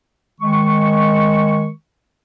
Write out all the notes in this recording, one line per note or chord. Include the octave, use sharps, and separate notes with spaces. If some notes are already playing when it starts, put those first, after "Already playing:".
D#3 G#3 C#6